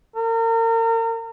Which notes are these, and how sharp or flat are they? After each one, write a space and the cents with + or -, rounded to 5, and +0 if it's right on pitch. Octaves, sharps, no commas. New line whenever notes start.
A#4 -35